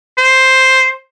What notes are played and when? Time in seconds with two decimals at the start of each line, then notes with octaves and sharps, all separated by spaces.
0.18 C5